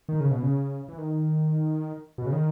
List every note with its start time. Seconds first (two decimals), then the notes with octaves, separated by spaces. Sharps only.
0.09 D#3
0.20 C#3
0.31 B2
0.43 C#3
0.89 E3
0.98 D#3
2.18 B2
2.26 C#3
2.33 D#3